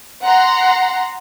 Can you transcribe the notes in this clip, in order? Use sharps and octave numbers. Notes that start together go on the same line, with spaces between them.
F#5 A#5 C6